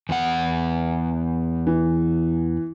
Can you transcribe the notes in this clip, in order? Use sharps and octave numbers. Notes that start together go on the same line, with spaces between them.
E2 B3 F#5
E3